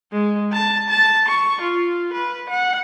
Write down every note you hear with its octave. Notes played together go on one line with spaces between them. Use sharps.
G#3
A5
A5
C#6
F4
B4
F#5